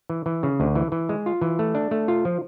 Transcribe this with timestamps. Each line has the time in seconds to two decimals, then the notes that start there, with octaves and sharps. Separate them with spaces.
0.10 E3
0.26 E3
0.43 C#3
0.60 D2
0.75 E3
0.92 E3
1.09 G#3
1.26 F4
1.41 E3
1.59 A3
1.75 D4
1.91 A3
2.08 F4
2.25 F3